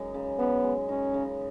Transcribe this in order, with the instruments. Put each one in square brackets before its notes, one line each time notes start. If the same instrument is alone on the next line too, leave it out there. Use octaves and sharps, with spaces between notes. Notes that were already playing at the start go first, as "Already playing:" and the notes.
Already playing: [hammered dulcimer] F#2 G#3 D#4
C#3
[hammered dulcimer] F#2 [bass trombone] B3
[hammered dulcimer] G#3
[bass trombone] C#4 [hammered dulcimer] D#4
[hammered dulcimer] C#3